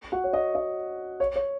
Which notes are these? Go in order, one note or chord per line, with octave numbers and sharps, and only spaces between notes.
F#4 F#5
C#5
D#5
D#5
C#5
C#5